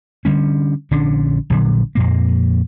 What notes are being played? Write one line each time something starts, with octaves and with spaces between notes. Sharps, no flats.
D3 G3 C#4
A#1 D3 C#4 D4
A#1 A#2 D3 F#3
F2 A#2 A#3